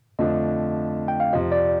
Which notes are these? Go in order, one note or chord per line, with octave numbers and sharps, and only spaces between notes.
F2 D3 F3 A3 D4 D#5
G5
F5
F2 C3 F3 D#5
D5